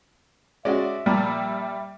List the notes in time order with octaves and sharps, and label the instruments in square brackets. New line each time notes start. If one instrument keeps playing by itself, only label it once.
[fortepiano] G#3 C#4 F#4 [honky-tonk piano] D5 [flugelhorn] E5
[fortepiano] A#2 F3 D6 [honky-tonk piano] G3